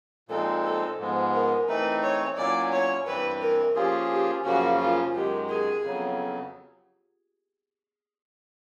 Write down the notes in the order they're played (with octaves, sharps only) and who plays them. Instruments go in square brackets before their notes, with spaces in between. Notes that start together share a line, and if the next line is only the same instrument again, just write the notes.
[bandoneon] A#2 F3 G#3 C4 D#4 [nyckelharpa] A4
[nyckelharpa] A4
[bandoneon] G#2 F3 G#3 B3
[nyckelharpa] A#4
[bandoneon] E3 A3 C4 D#4 [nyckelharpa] B4
[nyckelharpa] C#5
[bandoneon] A#2 F#3 A#3 C#4 E4 [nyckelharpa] D5
[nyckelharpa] C#5
[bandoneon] G2 E3 G3 C4 [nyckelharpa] B4
[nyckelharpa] A#4
[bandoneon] F3 A#3 C#4 F4 G#4 [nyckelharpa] G4
[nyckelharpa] G4
[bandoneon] F#2 C#3 F3 A#3 C#4 [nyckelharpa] F#4
[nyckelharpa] F4
[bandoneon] F#2 D#3 G#3 [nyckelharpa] G4
[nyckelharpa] G#4
[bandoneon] F2 C#3 F#3 B3